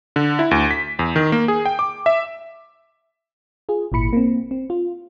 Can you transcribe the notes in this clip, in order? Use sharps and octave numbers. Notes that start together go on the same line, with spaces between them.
D3
E4
D2
B6
E2
D#3
A#3
G#4
G5
D6
E5
F4 G#4
G#1 A#2 E4 B5 C#7
A#3 C4
C4
F4